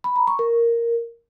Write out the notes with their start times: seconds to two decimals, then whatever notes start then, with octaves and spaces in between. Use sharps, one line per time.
0.04 B5
0.16 A#5
0.27 C#6
0.39 A#4